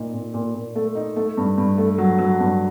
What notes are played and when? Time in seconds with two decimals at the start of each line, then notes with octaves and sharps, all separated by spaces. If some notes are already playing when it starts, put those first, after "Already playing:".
Already playing: A#2 D#4
0.14 A#2
0.34 A#2
0.54 A#2
0.76 A3
0.95 D#4
1.16 A3
1.37 G2
1.58 G2
1.78 A3
1.98 F#3
2.18 F#3
2.40 G2